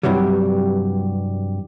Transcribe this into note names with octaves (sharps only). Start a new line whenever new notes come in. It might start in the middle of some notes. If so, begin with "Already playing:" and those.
G2 C3 E3 F#3 G3